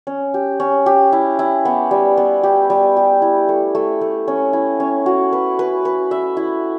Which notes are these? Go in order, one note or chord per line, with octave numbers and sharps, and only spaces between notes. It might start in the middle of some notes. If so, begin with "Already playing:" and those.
C#4
G4
C#4
G4
E4
E4
B3
G3
B3
G4
G3
G4
E4
A3
A3
A3
C#4
E4
C#4
F#4
B4
B4
B4
E5
E4